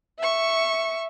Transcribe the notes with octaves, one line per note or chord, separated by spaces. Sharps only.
E5 C#6